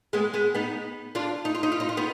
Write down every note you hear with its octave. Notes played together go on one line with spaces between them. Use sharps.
G#3 B3
G#3 B3
B3 D#4
D4 F4
D#4
F4
D#4
F4
D#4
F4
B3 D#4